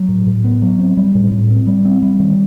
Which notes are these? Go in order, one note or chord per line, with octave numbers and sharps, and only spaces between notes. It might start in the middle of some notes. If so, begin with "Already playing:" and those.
Already playing: F#3
A2
A2
B3
F#3
C4
G3
A2
A2
C4
G3
C4
G3
D#3